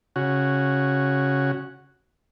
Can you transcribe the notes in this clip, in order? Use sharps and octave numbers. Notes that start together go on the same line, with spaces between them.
C#3 F#4